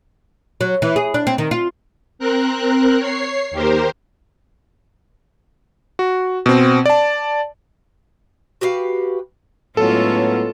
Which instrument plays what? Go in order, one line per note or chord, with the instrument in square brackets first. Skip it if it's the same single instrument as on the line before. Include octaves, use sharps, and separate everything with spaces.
[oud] F#3
E3
G#4
D4
C4
D#3
F4
[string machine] C4 A#4 F#6
C#5 C7
D#2 G4 A#4 C5
[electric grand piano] F#4
B2 C4
D5 A5
[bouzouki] F#4 G4 B4 F5
[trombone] A2 [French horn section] F#3 B3 [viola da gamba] G#3 C#4 F4 [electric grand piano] A4